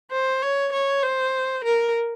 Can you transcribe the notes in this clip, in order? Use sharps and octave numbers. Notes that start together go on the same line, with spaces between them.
C5
C#5
C#5
C5
A#4